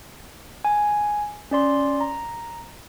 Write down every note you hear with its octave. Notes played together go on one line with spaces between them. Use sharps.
G#5
C#4 D5 C6
A#5